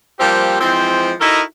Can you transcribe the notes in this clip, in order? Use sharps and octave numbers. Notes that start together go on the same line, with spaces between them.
F3 G3 A#3 C4 G4
E3 F3 G#3 C4
D#4 E4 F#4 A4 A#4 D#5